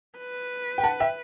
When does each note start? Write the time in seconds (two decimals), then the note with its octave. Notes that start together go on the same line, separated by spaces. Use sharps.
0.18 B4
0.78 G5
0.83 F#5 A5
1.00 E5 G5